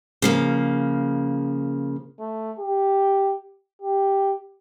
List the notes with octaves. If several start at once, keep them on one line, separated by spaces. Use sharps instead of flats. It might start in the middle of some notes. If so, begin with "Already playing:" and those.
C#3 F3 A#3
A3
G4
G4